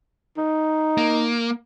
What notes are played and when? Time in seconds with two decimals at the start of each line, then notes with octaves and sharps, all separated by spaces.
0.38 D#4
0.98 A#3